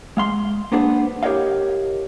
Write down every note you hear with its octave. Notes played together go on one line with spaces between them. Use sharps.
G#3 F5 C6
A#3 B3 D4 G#4 C5
E4 G4 A#4 C#5 D#5 F5